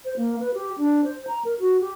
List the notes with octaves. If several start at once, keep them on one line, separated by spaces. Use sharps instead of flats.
C5
A#3
B4
G4
D4
C5
A#5
A#4
F#4
G4